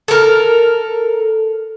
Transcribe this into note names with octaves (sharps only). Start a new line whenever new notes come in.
A4 A#4